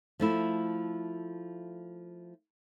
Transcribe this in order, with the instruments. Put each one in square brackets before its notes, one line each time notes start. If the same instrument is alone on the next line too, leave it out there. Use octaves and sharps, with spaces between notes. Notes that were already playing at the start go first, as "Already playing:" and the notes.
[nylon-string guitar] F3 A3 E4